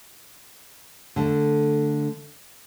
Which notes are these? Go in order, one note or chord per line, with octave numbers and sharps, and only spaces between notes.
D3 A3